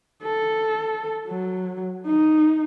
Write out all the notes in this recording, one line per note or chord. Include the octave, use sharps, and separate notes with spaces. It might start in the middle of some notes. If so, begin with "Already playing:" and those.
A4
F#3
D#4